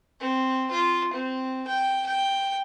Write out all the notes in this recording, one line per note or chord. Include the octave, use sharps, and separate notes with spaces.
C4
F4
C4
G5
G5